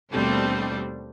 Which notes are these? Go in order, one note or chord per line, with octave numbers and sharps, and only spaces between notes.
D#2 B2 G3 A3 C4 D4